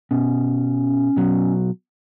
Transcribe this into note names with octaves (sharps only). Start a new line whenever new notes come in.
B2 C#4
B2 F#3